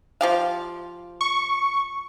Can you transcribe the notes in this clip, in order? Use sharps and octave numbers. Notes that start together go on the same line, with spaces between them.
F3 G4 F5
C#6